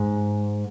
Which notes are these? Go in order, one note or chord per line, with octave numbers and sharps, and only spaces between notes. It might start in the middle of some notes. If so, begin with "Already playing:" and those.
Already playing: G#2